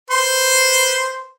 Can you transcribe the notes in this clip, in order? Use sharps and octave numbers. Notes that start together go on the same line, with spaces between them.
B4 C5 C6